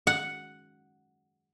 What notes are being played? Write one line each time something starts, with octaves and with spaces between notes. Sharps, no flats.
F#5